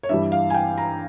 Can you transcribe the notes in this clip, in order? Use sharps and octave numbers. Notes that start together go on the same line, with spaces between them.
C#5
G2 E3 G3 E5
F5
G#5
G5
A#5